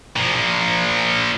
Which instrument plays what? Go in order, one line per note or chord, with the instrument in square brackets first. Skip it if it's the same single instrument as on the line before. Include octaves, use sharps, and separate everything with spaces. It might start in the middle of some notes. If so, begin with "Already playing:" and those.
[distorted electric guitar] A#2 F3